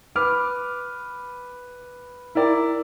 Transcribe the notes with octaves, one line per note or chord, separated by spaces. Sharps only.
B4 D6 F6
E4 A#4 D5